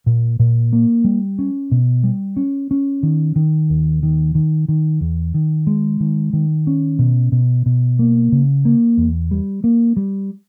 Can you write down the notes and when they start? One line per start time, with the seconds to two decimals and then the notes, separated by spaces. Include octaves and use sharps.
0.06 A#2
0.39 A#2
0.73 A#3
1.04 G3
1.39 C#4
1.71 B2
2.03 G3
2.37 C#4
2.71 C#4
3.03 D#3
3.36 D#3
3.70 D#2
4.03 D#3
4.35 D#3
4.68 D#3
5.01 E2
5.34 D#3
5.67 G#3
6.00 D#3
6.33 D#3
6.67 C#4
6.99 B2
7.32 B2
7.66 B2
7.99 A#3
8.32 C#3
8.65 A#3
8.97 E2
9.31 G3
9.64 A#3
9.96 G3